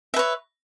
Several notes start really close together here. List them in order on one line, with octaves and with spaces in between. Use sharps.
E5 B4 C#5